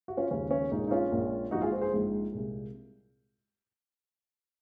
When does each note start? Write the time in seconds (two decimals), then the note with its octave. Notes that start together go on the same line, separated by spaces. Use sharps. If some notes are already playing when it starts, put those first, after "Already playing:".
0.08 F#4
0.17 C#4 F4
0.31 D#2 C#3 F3 G#3 C#4
0.51 C#4
0.71 A#1 A#2 G#3 D#4
0.87 D#4
0.91 C#4 F4
1.12 A#1 A#2 G#3
1.51 A#1 G#2 F3 G#3 D#4 F#4
1.61 F4 G#4
1.71 G#4 C5
1.81 G#4 C5
1.92 A#1 G#2 F3 G#3
2.33 C2 A#2 G#3